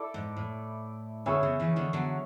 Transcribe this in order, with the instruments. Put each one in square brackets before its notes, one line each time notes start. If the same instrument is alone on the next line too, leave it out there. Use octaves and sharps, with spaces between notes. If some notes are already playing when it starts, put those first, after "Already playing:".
Already playing: [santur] E4 A4 D5
[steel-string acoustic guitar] G#2
A2
[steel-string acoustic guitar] B2 D3 [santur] C#4 E4 G#4 C#5
[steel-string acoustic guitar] C#3
C#3 E3
B2 D3
D3 F#3